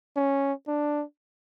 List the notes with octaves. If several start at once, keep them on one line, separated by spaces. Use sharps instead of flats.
C#4
D4